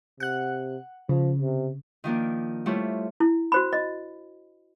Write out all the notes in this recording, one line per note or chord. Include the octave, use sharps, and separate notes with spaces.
C3 F#5 F#6
C#3 F3
C3
D#3 F3 A#3 D4
G3 A3 E4 F4 C5 C#5
E4
F#4 C5 B5
D#5